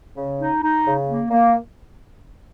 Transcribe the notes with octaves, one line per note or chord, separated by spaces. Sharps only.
C#3
D#4
D#4
C#3
A#3
A#3